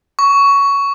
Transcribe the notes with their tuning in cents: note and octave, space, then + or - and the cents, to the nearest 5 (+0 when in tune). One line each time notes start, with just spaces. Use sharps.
C#6 +15